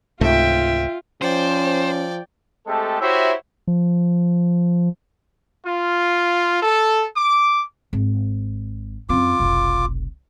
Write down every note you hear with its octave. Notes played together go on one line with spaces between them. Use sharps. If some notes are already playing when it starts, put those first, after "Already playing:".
C#2 G#2 C3 A3 F4 E5 G5
F3 C#4 C5 D5 G5
G#3 A3 C4 G4 A4
E4 F#4 G4 C5 C#5 E5
F3
F4
A4
D6
G#1
F#2 C4 F4 D6
F1 B1